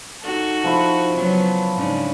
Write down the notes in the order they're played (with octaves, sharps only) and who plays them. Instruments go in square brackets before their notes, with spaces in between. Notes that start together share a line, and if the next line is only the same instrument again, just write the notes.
[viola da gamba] D#4 F#4 A4
[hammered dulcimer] F3 E4 C#6
[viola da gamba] C#3 F#3 B3
G#2 C#3 D4